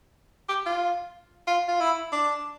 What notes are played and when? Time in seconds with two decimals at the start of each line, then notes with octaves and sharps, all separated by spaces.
0.49 G4
0.66 F4
1.47 F4
1.68 F4
1.80 E4
2.12 D4